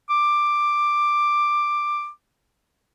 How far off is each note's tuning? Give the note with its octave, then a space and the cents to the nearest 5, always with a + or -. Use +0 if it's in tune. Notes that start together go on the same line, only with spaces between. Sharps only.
D6 +10